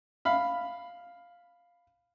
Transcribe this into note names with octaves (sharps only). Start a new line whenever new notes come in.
F5 B5